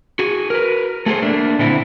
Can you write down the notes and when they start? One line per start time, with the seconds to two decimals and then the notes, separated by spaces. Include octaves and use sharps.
0.19 F#4 G#4
0.50 A#4 B4
1.06 A3 G#4 A4 C5
1.22 A3 A#3 D4
1.59 A#2 D3 C4 E4